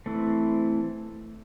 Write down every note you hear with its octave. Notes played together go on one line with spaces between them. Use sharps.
E3 A3 C4 E4